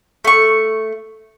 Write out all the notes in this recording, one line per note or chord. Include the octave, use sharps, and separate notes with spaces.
A3 C#6